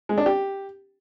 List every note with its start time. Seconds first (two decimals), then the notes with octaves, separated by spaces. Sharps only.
0.09 G#3
0.18 D4
0.26 G4